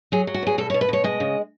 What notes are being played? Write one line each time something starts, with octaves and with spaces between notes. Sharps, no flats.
F#3 G#4
F#3
F#4
E2 G#4
B2 A4
C#5
B2
B4
B2 C#5
G#3 D#5
C#3